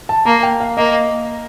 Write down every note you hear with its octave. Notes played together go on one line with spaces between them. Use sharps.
A5
A#3 A#5
G5
F5
A#3 D#5